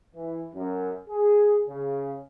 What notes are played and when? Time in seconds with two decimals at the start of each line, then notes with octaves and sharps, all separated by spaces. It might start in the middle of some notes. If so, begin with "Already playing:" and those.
0.15 E3
0.54 F#2
1.09 G#4
1.68 C#3